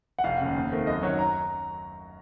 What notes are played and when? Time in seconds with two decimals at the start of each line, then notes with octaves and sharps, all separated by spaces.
0.19 F#5
0.24 F1 F5
0.40 D#2 C#3
0.56 D#2
0.72 D#3 A3 C4
0.87 F#2 D#5
1.03 D#3 F#3 C#5
1.19 A#5